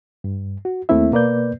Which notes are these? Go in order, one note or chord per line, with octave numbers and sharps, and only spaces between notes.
G2
F#4
D#2 A3 A#3 C4 E4 E5
B2 A#3 B4 D5 G6